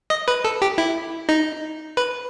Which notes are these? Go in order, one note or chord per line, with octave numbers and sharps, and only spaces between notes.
D#5
B4
A4
G4
E4
D#4
B4